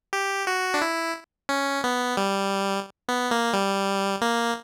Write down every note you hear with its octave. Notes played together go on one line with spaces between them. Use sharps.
G4
F#4
D4
E4
C#4
B3
G3
B3
A#3
G3
A#3